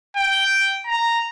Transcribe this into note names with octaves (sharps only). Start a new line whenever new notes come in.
G5
A#5